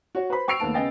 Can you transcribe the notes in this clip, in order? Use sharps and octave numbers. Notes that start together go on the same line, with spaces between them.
F#4 C#5
B4 C5 B5
G5 C#6 E6 C7 D7 F7
D#2 A3 B3 A5 D7
C#3 B3 D#5 G5 G#5 A6